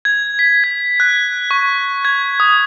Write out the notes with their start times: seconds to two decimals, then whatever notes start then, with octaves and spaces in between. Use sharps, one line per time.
0.05 G#6
0.39 B6
0.64 G#6
1.00 F#6
1.51 C#6
2.05 G#6
2.40 D#6